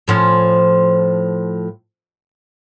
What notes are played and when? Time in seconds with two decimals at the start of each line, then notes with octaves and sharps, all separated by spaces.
0.08 A2 F3 C#4